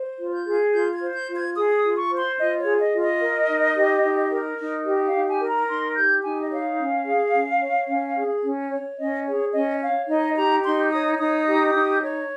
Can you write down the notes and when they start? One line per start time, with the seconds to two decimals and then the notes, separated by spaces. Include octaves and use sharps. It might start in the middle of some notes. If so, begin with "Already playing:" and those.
Already playing: C5
0.18 F4
0.32 G6
0.46 G#4
0.73 F4 G6
0.94 G#6
1.01 C5
1.14 G6
1.28 F4
1.35 G#6
1.56 G#4 D#6
1.76 D#6
1.84 F4
1.97 C#6
2.10 C5
2.18 C6
2.38 F4 D#5
2.59 C#5
2.66 G#4
2.80 D#5
2.94 F4
3.00 D#5
3.21 A#4
3.48 D#4
3.76 G4
4.03 D#4
4.31 A#4
4.59 D#4
4.86 G4 D#5
5.07 F5
5.13 D#4
5.28 G#5
5.41 A#4
5.47 A#5
5.69 D#4 C6
5.96 G4 G6
6.24 D#4 G#5
6.42 D#5
6.51 C#5 F5
6.79 C#4
7.06 G#4
7.34 C#4
7.61 C#5
7.88 C#4
8.16 G#4
8.44 C#4
8.71 C#5
8.98 C#4 D#5
9.26 G#4 C#5
9.54 C#4 D#5
9.81 C#5 F5
10.09 D#4 D#5
10.36 G4 A#5
10.64 D#4 C6
10.91 C#5 D#6
11.19 D#4 D#6
11.47 G4
11.74 D#4
12.02 C#5